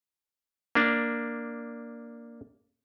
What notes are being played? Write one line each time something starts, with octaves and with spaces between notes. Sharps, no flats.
A#3 D4